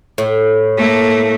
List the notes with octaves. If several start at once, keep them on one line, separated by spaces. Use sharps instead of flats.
A2
A3 A#3